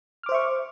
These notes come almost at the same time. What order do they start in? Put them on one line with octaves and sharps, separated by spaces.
F6 D6 C5 E5 C#6